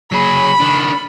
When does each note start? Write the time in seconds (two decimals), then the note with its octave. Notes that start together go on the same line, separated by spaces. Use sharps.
0.12 F#3 G#4 B5
0.60 D#3 D4